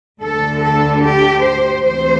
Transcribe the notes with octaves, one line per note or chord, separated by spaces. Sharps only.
D2 D3 A4
A4
G4
C5
D2 C3 E3 C5